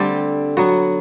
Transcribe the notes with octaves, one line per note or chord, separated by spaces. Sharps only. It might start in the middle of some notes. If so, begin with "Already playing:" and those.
Already playing: D3 G3 A3 C4 D4 G4
F#3 B3 F#4